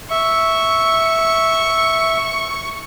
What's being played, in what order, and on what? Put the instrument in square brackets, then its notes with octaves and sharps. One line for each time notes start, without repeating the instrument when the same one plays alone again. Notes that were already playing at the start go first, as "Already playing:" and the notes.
[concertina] E5 [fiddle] C#6